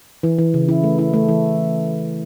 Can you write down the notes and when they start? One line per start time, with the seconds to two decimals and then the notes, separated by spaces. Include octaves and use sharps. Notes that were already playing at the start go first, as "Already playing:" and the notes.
0.23 E3
0.39 E3
0.54 C#3
0.69 E4
0.84 A3
0.99 E4
1.14 A3
1.29 E3